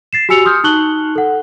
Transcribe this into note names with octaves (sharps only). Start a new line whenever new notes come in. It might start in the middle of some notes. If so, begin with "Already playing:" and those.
A6 C7 E7
F#4 G4 G#5 E6 C#7 F7
C6 D#6 F6 G6
D#4 A5 C#6 F#6 F#7 G7
A4 F#5